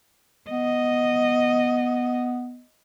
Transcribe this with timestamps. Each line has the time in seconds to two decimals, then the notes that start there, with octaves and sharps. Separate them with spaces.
0.50 B3 D#5